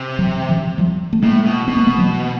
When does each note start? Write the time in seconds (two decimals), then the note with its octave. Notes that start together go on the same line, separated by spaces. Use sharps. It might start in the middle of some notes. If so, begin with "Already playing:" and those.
Already playing: C3
0.19 E3 F#3
0.49 D#3 F3
0.78 F3 G3
1.13 A3
1.22 A2 G#3 A#3
1.45 B2
1.68 B2 B3
1.77 A#3
1.87 A3 B3
1.98 E3 F#3